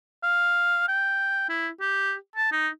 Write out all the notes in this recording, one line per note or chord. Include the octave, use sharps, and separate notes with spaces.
F5
G5
E4
G4
A5
D#4